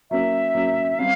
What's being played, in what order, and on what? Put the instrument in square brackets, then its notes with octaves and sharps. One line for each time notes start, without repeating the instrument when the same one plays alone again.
[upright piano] F#3 A#3 C#4 [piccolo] E5
[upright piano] F#3 A#3 C#4
[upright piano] G3 C4 [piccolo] F5